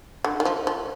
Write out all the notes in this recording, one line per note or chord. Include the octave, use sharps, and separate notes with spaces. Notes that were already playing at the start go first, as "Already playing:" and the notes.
D3
D#3
F3
F3